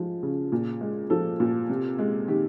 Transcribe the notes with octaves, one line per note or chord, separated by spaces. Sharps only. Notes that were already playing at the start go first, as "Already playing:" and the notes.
Already playing: F3 G#3
C#3
A#2
G#3
F3 A4
A#2
C3
G#3
D#3 G4